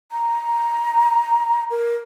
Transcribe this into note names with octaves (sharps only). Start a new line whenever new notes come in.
A#5
A#4